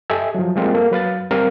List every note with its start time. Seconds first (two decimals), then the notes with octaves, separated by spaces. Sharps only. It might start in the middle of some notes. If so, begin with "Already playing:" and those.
0.10 G4 A4 D#5 E5 G#5
0.35 F3 F#3
0.56 G3 G#3 A#3 C4 F4
0.74 A#3 A4
0.91 F#3 B4 F5 A6
1.31 G3 C4 A#4 F5